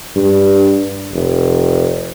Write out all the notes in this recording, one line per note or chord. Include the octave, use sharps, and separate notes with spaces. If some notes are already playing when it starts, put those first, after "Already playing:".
G2
F1